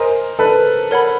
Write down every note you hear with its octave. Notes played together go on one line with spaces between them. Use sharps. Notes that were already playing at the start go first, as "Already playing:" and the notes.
Already playing: A#4 C5 D#5 G#5 C6 D#6
A4 B4
A#4 C#5 F#5 B5